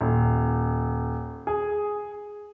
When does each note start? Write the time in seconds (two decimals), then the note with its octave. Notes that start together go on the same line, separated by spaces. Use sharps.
0.01 D#1
1.47 G#4